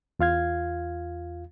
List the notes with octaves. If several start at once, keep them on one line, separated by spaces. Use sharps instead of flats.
E2 F4 F5 G#6